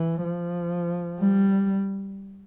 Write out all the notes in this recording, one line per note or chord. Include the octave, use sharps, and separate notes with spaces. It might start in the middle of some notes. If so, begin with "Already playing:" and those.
Already playing: E3
F3
G3